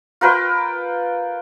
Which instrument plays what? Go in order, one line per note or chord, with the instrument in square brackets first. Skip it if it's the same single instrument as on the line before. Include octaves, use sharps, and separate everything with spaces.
[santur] F4 A#4 B4 G5